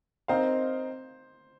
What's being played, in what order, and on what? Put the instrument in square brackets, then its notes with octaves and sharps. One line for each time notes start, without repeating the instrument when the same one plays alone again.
[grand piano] C4 D#4 A#4 F5 [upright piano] C5